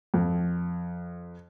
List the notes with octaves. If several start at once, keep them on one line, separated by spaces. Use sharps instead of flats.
F2